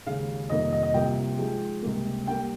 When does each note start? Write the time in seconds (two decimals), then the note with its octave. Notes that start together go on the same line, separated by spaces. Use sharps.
0.06 D#2 C#3 G#3 F5
0.50 F2 C3 D#3 G3 A#3 D#5
0.72 D#5
0.83 D#5
0.94 C2 C3 F3 A#3 G5
1.39 G#2 F3 G#3
1.82 C#2 C3 G3 A#3
2.27 G2 G3 A#3 G5